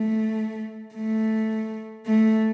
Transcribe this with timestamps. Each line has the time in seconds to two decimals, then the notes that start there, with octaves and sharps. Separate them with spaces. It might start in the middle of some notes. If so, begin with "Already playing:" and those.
Already playing: A3
0.94 A3
2.06 A3